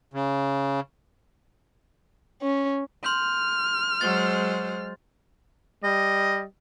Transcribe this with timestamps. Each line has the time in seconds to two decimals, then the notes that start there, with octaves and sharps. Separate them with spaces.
0.14 C#3
2.41 C#4
3.04 C6 F6 G6
4.01 F#3 G#3 C5 A6
5.84 G3 D#5